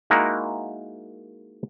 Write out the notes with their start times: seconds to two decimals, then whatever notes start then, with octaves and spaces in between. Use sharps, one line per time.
0.10 G#3 A#3 D#4 E4 F#4 A#4